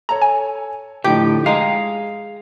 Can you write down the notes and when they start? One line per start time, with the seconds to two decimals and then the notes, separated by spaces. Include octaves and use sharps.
0.09 A4 C#5 A#5
0.22 G#5
1.04 A2 D3 F3 D#4 G4
1.46 G#3 G#4 F5 G5 A#5